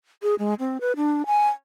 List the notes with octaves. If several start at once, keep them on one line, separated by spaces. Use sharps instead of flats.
G#4
G#3
C4
B4
D4
G#5